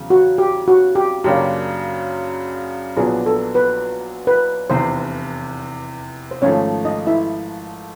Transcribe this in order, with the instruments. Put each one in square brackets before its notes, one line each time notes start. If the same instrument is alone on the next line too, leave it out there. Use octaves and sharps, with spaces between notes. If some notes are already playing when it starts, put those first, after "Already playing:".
Already playing: [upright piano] E2 C#3 F#3
[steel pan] F#4
G4
F#4
G4
[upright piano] F#2 C#3 F#3 A#3 D4 [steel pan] G4
[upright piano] A#1 A#2 F#3 B3 D4 [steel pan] G#4
[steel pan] A4
B4
B4
[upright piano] F1 E2 C3 [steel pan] C5
[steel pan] C5
[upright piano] G#1 G#2 F3 A3 [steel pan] C#4 C#5
[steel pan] D#4 D#5
E4 E5